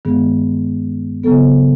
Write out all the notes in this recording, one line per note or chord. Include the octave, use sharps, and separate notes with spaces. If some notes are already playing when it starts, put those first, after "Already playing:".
G2 D#3 G#3 B3 G#4
C#3 F#3 B3 A4